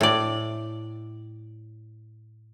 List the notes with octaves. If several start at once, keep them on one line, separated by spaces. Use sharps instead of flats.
A2 D5